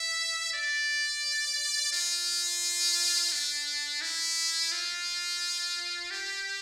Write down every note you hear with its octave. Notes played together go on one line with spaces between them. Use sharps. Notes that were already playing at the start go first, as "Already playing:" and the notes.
Already playing: E5
D5
F4
D4
E4
F4
G4